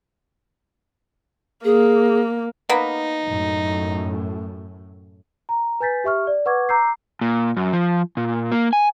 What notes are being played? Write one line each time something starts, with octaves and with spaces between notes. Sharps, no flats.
A#3 G#4
A#3 B3 D#4
F#2 A2
A#5
B4 G#5 G6 A6 B6
G4 E5 C#6 F6
D5
B4 F#5 C#6 D6 G#6
A#5 D6 E6 G6 C7
A#2
F#2
F3
A#2
A#3
G#5